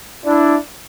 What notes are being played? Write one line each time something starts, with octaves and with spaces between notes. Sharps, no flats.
D4 E4